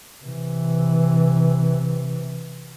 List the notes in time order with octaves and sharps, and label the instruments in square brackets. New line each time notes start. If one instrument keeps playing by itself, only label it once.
[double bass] C3 E3